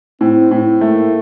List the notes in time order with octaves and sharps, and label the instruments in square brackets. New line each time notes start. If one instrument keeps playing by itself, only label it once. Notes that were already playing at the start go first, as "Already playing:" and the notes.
[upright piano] A2 [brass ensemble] C4
[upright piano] A2
[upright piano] A3 [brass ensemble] A#3